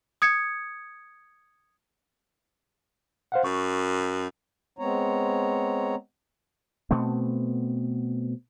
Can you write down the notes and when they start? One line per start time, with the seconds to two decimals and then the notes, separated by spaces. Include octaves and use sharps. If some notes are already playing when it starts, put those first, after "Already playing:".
0.22 D#6 G#6 C#7
3.32 C5 F5 F#5
3.44 F#2 C#6
4.79 G#3 B3 C4 C#5 A#5
6.91 B2 A3 B3 C4